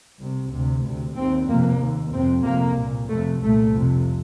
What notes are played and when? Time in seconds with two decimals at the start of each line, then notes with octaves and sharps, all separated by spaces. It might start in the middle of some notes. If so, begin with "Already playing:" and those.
0.19 C2 C3
0.52 D2 C3
0.84 D2 C3
1.15 D#2 C4
1.48 F2 C3 A#3
1.80 D#2
2.12 F2 C3 C4
2.44 F2 C3 A#3
2.78 C2 A#2
3.09 F2 C3 A3
3.41 C2 A#2 A3
3.74 F2 C3